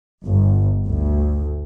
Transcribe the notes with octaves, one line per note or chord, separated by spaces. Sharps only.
G1
D2